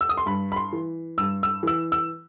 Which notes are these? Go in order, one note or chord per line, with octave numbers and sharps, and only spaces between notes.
E6
D#6
C6
G2 B5
B5
C6
E3
G2 E6
E6
E3 E6
E6